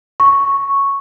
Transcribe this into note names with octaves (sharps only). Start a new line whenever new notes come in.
C#6